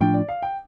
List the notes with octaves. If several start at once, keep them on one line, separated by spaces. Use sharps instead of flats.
A2 F3 D4 G5
D5
F5
G5